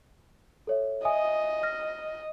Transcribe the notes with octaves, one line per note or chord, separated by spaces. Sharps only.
A4 C#5 E5
D#5 E5 G#5 D#6
F6 A#6